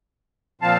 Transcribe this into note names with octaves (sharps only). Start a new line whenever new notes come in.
A#2 F3 C4 F5 A5